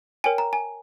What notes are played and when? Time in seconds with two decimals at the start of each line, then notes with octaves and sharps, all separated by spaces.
0.24 A#4 C#5 G5 G#5
0.38 A#5
0.53 G#5